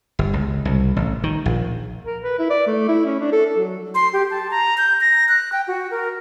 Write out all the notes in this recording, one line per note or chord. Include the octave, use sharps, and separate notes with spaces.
G1
C#2
C2
A1
D#3
A#1
A#4
B4
E4
D5
A3
E4
C#4
D4
A4
A4
F#3
C6
G4
A5
A#5
G6
A#6
F#6
G5
F#4
A#4